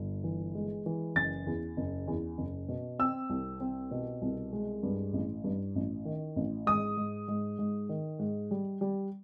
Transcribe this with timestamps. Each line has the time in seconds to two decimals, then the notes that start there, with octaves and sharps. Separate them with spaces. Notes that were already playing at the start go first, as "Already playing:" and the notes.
Already playing: G1
0.24 E3
0.55 G#3
0.86 E3
1.15 F#1 A6
1.46 E2
1.77 F#1
2.07 E2
2.38 F#1
2.68 B2
2.99 C4 E6
3.30 C2
3.60 C4
3.91 B2
4.22 C2
4.53 G#3
4.83 G2
5.13 A1
5.44 G2
5.75 A1
6.05 D#3
6.36 A1
6.66 G#2 D#6
6.97 G#2
7.28 G#2
7.59 G#2
7.89 D#3
8.19 G#2
8.51 G3
8.81 G3